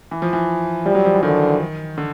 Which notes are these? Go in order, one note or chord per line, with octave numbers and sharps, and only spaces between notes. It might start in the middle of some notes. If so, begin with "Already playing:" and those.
E3
F3
E3
F3 G3
F#3
F3
E3
D3 D#3
D3